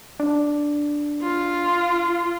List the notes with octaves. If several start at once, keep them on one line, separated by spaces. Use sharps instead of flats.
D4
F4